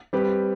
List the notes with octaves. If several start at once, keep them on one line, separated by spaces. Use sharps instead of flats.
G3 C4 G4 B4